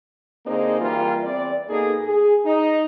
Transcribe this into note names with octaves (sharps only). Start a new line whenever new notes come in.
D3 A#3 C4 D#4 G#4
E3 G3 A#3 F4 A#4
E2 C4 D5
B2 A#3 D#4 G#4 A4
G#4
D#4